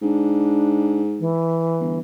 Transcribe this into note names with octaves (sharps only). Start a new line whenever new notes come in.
G#2 D4
E3
G1